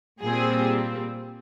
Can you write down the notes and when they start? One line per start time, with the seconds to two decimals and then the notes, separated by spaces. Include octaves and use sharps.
0.22 A#2 G3 C4 G#4